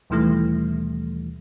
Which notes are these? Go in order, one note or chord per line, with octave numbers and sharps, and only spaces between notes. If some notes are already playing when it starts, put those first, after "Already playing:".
D#2 B2 D#3 E3 G3 A3